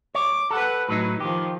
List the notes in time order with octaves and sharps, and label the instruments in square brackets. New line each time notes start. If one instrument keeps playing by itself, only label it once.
[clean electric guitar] C#5 [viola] D6
[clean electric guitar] A4 [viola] B4 F#5
[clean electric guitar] A2 F#3 D#4 [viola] E4 B4
[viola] D#3 F3 [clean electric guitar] G4